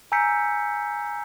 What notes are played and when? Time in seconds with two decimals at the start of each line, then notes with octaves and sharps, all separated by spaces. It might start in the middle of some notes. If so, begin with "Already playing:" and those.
0.12 G#5 A#5 E6 G6 B6 C#7